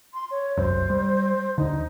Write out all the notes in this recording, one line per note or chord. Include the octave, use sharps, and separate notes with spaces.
C6
C#5
F#1 C2 F#2 C5
G3
D#2 D3 D#4